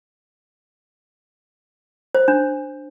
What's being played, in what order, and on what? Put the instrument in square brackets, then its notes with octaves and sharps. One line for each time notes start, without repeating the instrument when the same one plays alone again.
[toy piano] C5
D4